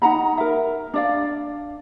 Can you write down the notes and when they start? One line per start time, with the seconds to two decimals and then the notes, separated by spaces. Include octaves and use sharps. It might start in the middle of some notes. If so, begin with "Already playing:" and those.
0.02 D#4 F#5 A#5 B5
0.37 A#4 E5
0.94 D4 D5 F5